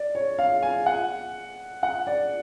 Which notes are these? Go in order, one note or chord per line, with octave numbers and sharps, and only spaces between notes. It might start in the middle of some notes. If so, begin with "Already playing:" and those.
Already playing: D5
C#5
F5
G#5
F#5
F#5
D5